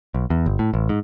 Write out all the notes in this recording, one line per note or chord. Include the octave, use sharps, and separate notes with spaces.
B1
E2
G1
A2
A1
G#2